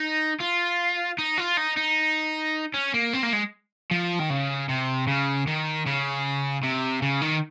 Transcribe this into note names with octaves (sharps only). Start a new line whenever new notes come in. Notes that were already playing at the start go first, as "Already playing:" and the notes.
Already playing: D#4
F4
D#4
F4
D#4
D#4
C#4
A#3
C4
A#3
G#3
F3
D#3
C#3
C3
C#3
D#3
C#3
C3
C#3
D#3